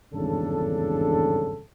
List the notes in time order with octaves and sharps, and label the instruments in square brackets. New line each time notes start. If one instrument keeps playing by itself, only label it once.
[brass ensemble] G#1 E2 G2 C#3 D4 A4